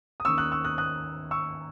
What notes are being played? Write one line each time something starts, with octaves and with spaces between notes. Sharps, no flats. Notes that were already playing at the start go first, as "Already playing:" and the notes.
D#6
D#2 D#3 A#3 C#4 C#6 E6
D#6 F#6
C#6 E6
D#6 F#6
D#6 F#6
C#6 E6